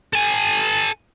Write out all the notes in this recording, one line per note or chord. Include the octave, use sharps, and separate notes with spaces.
A4 G#5